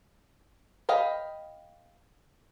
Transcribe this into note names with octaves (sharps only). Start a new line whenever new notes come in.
D#5 F5 G5 B5